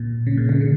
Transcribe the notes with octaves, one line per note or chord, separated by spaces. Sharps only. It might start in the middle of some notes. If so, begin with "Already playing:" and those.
Already playing: A#2
C#3
A#2
C#3
D3